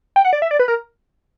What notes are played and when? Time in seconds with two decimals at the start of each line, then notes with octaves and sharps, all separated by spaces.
0.16 G5
0.25 F#5
0.33 D5
0.42 E5
0.51 D5
0.59 B4
0.68 A#4